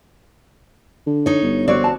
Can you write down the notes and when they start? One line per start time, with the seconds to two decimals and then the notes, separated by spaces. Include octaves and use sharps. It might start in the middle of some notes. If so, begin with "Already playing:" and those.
1.07 D3
1.26 D#4 C#5
1.43 G1
1.68 C4 F#4 C#5 D5
1.84 F#4 A5